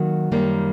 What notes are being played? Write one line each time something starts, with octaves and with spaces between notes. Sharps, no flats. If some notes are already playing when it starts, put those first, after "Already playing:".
Already playing: D#3 F#3 A#3 F#4
F#2 D#3 G3 A#3